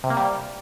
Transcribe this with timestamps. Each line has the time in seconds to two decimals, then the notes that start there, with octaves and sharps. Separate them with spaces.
0.04 C3
0.10 A#3
0.17 G3